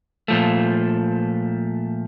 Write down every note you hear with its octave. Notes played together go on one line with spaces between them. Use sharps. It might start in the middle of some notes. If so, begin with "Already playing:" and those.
A#2 F3 A3